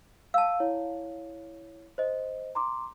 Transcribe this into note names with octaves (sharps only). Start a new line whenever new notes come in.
F5 A5 E6
E4 C#5
C5 D#5
A#5 C6 D6